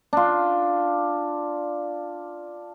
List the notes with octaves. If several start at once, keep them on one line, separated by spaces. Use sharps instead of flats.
D4 F4